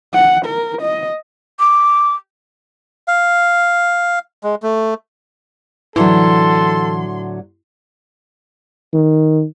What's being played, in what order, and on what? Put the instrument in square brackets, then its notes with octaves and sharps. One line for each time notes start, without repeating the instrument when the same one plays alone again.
[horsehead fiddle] F#5
A#4
D#5
[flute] D6
[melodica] F5
G#3
A3
[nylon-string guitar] A2 D3 F#3 [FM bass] E3 [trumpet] A4 [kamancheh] C6
[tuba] D#3